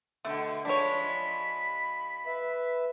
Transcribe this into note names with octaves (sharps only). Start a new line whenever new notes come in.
B2 D3 A3
F3 G#3 D4 C#5 B5
B4 E5